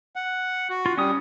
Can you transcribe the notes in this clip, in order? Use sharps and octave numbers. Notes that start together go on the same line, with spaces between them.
F#5
F#4
F4
G3 C#4 D#6